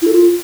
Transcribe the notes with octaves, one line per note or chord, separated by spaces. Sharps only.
E4
A4
F4